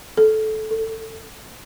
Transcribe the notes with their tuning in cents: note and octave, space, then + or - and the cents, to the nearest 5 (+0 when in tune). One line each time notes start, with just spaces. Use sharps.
A4 -15
A4 +20